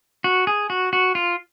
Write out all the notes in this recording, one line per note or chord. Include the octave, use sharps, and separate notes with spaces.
F#4
G#4
F#4
F#4
F4